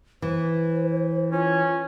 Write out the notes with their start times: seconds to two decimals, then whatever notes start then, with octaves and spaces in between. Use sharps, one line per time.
0.22 E3 C5
1.32 C#4 F4